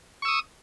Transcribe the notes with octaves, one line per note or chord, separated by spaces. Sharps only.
C#6 D#6 E6